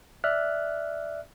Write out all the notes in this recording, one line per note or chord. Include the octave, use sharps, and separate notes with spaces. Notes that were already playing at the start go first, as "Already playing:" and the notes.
D5 E5 F6 F#6